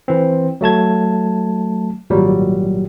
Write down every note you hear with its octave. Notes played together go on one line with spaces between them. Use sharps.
E3 C4
F#3 A3 A5 G#6
G#1 A#2 F#3 G3